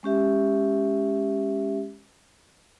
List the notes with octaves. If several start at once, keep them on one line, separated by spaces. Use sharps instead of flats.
G#3 C#4 G4 E5